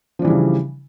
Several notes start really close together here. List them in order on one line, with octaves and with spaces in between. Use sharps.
F3 D4 E3 G3 C#3